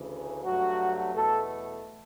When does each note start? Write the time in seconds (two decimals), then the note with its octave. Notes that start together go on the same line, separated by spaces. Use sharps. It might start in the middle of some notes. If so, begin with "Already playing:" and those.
Already playing: D2 C#3 E3
0.44 G2 F#3 A3 F#4
1.14 E2 B2 A3 A4